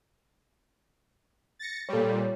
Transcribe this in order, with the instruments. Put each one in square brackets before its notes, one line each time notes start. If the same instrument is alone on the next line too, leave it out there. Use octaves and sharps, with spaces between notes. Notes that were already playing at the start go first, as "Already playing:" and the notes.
[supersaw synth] A6 A#6 C#7
[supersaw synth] A#2 G3 [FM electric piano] A4 C#5